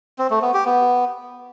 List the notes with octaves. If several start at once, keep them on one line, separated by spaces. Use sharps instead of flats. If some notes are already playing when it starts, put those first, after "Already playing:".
C4
A3
B3
G4
B3